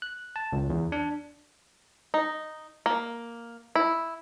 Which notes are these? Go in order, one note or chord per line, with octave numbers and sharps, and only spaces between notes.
F#6
A5
C#2
E2
D4
D#4
A#3
E4